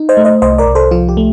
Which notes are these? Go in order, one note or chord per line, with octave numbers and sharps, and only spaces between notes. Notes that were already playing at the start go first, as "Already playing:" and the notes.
Already playing: D#4
C5 D#5
A3
C5 D#5
C2 C5 D#5
A#4 D5
C2
A4 C5
F3 F4
G4
A3